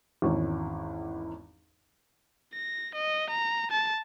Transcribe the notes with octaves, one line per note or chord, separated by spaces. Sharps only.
G#1 E2 C#4
A#6
D#5
A#5
A5